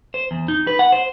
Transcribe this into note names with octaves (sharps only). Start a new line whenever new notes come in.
C5
E2
D#4
B4
F#5
C5